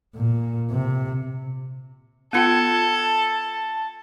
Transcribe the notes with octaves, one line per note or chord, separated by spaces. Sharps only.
A#2
C3
B3 F4 A4 G5 G#6
A5